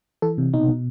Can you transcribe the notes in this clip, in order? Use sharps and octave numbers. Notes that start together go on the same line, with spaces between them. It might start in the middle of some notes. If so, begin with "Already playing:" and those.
E3 A4
C3
B2 D#4
B2